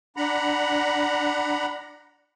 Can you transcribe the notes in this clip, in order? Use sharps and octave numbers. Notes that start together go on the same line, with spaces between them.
D4 F#5 A#5 B5